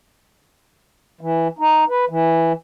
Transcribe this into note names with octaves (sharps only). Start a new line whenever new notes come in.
E3
D#4
B4
E3